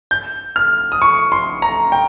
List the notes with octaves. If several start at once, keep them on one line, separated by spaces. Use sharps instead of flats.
G6
F6
D#6
C#6
C6
A#5
G5